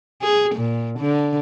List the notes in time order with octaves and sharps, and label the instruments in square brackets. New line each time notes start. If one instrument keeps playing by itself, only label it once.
[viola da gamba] G#4
A#2
D3